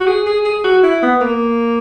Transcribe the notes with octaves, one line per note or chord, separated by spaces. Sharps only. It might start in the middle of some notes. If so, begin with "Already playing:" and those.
F#4
G#4
G#4
G#4
F#4
E4
B3
A#3